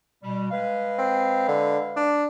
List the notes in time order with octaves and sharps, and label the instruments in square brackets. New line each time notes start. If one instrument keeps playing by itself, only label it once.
[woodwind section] B2 G3
G#3 B4 F5
[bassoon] C4
D3
D4